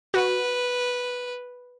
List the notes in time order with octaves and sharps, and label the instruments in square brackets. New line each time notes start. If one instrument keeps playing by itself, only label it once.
[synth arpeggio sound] F#4 [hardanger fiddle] B4